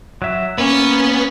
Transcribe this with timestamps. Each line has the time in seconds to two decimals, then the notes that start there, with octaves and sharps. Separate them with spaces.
0.22 F#3 E5
0.58 A#3 B3 C#4 B4